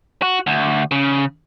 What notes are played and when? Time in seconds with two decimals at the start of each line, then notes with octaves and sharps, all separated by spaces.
0.22 F#4
0.47 D2
0.91 C#3